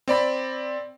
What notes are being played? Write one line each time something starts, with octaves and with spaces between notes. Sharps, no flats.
C4 D5 B5